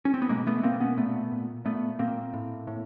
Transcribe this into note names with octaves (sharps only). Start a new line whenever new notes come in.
C#4
C4
B3
B2 G#3 A#3
A3 B3
B2 A#3 C4
B3 C#4
A#2 A3 B3
A#2
A#2 A3 B3
A#2 A#3 C4
A2
A2